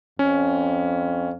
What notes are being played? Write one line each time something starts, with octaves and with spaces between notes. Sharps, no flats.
F2 C#4